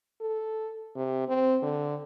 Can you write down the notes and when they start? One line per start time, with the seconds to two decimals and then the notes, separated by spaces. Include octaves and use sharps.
0.21 A4
0.96 C3
1.28 C4
1.62 D3